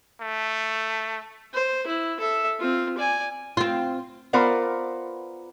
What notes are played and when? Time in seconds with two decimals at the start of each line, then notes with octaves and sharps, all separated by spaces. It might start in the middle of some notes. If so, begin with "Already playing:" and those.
0.21 A3
1.54 C5
1.87 E4
2.20 A4 E5
2.60 C4 F4
2.98 D5 G#5
3.57 C4 F4
4.33 B3 F4 A#4 C5 D5 F#5